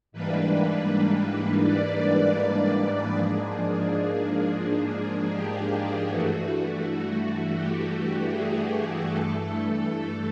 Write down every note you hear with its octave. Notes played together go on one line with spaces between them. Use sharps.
G#2 E3 G3 A#3 D4 B4
D5
D5
G#2 F3 A#3 D4 G#4
G4
G4
G2 E3 A3 F#4
G4
G#4
G2 E3 A3 A4
A4